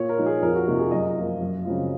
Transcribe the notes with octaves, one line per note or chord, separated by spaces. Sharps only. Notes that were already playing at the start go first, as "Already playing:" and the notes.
Already playing: A#2 C#5
A#4
F3 A#3 D#4
G#4
F2 A#4
F#4
C3 F3 A#3 D#4 F#4
G#4
F#2 D#5
F3 A#3 F4
F#2
C#3 F#3 C4 F4